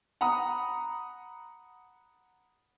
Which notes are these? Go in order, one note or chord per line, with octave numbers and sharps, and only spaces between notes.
F#5 A#5 B5 D#6